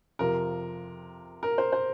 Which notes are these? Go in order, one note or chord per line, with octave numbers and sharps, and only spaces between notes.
F2 C3 F3 A#4
A#4
C5
C5